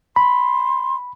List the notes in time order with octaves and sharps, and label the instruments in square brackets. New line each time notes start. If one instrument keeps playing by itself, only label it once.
[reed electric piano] B5 [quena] C6